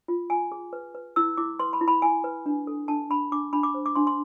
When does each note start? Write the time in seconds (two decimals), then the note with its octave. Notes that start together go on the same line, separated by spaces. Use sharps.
0.08 F4
0.30 F4 G#5
0.52 G#4
0.73 B4
0.95 B4
1.16 E4 E6
1.37 E4 D6
1.59 B4 C6
1.73 B5
1.81 E4
1.88 B5
2.02 E4 G#5
2.24 B4
2.46 D4
2.67 A4
2.88 D4 A5
3.10 D4 B5
3.32 D4 D6
3.53 D4 B5
3.63 D6
3.74 C5
3.86 D6
3.96 D4 C6
4.07 C6